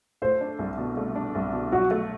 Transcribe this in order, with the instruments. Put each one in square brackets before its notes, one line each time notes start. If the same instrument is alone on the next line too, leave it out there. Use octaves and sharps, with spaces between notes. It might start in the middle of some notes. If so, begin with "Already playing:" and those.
[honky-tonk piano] A3 [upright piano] C5
[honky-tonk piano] D4
C2
B2
A3
D4
C2
B2
[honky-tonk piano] F#3 [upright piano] F#4
[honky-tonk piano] A3